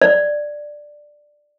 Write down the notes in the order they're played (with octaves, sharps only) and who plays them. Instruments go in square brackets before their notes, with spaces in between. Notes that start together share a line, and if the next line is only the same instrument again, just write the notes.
[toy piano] D5